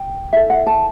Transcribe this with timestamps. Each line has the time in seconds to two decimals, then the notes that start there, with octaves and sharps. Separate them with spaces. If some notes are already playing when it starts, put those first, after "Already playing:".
Already playing: G5
0.33 E4 A4 E5
0.50 F#5
0.67 A5